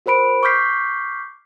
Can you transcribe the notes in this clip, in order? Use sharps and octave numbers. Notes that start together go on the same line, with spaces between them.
F#4 A#4 C5 B5 D7
C#6 D6 F6 G6 B6 C7